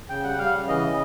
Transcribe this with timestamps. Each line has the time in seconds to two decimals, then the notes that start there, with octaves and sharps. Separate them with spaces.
0.09 C#3 G5
0.24 G3 F#5
0.39 G3 F5
0.53 C#3
0.68 E3 D#5
0.82 C#3